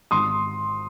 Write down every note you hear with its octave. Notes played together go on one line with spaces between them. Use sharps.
G#1 C6 D#6